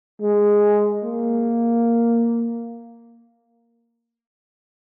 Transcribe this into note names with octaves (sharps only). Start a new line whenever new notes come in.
G#3
A#3